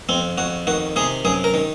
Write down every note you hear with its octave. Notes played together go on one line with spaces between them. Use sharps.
F2 C4
F2 F#4
D#3 F#4
C3 G#4
F#2 G#4
A#4
D#3